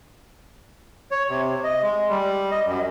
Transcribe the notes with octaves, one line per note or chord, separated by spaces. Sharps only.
C#5
C3
D#5
G#3
G3
D#5
F#2